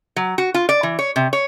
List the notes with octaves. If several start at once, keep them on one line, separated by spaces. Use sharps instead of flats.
F#3
F#4
F4
D5
E3
C#5
C3
C#5